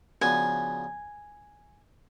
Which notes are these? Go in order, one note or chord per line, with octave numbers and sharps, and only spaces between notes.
C#3 F3 B3 D4 F#4 G#5